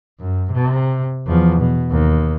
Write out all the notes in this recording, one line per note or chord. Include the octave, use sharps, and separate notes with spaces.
F#2
C3
E2 F3
B2
D#2